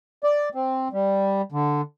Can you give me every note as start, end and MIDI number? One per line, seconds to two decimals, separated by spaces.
0.24 0.49 74
0.55 0.88 60
0.93 1.42 55
1.52 1.81 50